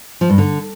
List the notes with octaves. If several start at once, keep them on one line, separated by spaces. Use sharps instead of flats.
F3
G2
D3